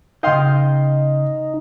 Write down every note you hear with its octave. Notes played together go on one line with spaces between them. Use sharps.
C#3 D#4 D#5 F5 G5 C6